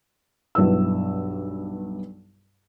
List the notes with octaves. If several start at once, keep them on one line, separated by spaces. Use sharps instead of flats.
B1 G2 E4 B4 E6